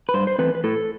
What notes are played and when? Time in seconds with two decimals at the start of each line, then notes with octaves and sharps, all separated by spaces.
0.09 B4
0.14 G2 C5
0.27 C5
0.39 E3 A3 C4 B4
0.55 B4
0.64 A2 A4